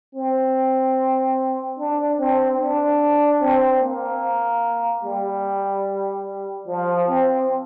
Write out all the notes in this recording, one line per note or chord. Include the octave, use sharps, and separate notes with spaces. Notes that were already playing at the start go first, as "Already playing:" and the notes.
C4
D4
C4
D4
C4
A#3
G3
F3
C4